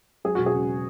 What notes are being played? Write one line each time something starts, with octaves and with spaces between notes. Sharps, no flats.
F#3 G#4
E1 F#4
G#4
C#3